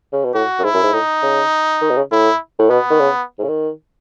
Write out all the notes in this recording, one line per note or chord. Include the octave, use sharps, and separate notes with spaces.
C#3
B2
A2 F#4
F#2
G#2 E4
F#2
G#2
A2 D#4
C#3
D#3
B2
C#3
A2 E4
A2
B2 B3
D#3
C#3
G#2
C#3
D#3